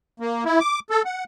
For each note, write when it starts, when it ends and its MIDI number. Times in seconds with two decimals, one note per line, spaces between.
0.20 0.44 58
0.45 0.60 64
0.60 0.79 86
0.90 1.02 69
1.05 1.24 78